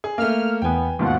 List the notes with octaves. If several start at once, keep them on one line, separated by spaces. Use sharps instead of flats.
G#4
A3 A#3 F6
E2 B3 G5 G#5
D#2 G#2 B2 F4 F#5